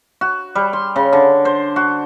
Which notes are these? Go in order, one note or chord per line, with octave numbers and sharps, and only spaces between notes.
F#4
G3
C6
C#3
D3
C5
F#4